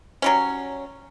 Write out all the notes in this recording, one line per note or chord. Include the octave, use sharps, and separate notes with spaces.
F#3 G3 C#4